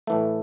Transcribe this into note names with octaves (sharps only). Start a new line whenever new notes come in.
A2 E3 A3